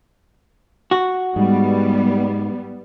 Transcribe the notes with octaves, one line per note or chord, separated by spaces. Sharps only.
F#4
G#2 G3 B3